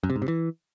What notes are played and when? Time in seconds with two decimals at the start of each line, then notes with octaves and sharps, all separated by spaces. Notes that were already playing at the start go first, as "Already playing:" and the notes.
0.03 F#2
0.10 C3
0.16 G#2
0.22 C3
0.28 E3